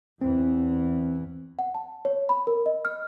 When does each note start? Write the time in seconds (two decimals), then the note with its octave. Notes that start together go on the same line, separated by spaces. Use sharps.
0.21 E2 E3 C4
1.59 F#5
1.74 A5
2.05 C#5
2.29 B5
2.47 A#4
2.66 D#5
2.85 F6